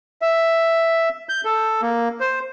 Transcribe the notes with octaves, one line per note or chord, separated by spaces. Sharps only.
E5
G6
A4
A#3
C5